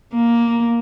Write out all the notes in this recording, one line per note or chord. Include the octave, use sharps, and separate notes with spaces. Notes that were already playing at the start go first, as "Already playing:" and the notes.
A#3